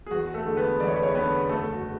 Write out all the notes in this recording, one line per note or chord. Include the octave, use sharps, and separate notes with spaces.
G#4
E2 F#4
A3 A4
D3 G#3
B3 B4
E2 D5
C#5
B4
C#4 C#5
D3 G#3 B3 B4
F#1 A3 A4
F#4